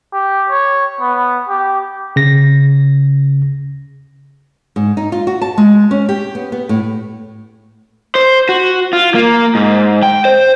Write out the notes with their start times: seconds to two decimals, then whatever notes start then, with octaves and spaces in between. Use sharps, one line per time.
0.13 G4
0.50 C#5
1.01 B3
1.49 G4
2.16 C#3 A#6
4.76 G#2
4.97 D#4
5.12 F4
5.27 F#4
5.42 A5
5.58 G#3
5.91 C#4
6.09 G4
6.35 B3
6.52 B3
6.69 A2
8.15 C5
8.49 F#4
8.93 F4
9.15 A#3
9.55 G#2
10.03 G5
10.25 C5